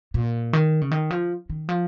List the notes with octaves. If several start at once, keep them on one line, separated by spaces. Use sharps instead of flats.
A#2
D#3
C#3
D#3
F3
D#3
F3